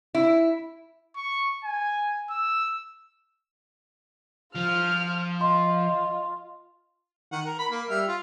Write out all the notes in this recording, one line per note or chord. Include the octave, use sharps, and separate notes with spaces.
E4
C#6
G#5
E6
F3 F4 F6
F4 D#5 C6
D#3 F#5
A#4
B5
A#3
G3 E5 F6
F4